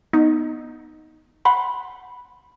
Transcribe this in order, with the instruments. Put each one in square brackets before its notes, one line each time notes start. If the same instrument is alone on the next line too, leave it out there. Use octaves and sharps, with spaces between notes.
[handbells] B3 [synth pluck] D#4
[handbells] F#5 B5 C6